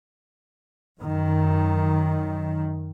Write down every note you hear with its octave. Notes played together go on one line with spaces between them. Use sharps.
F#2 D#3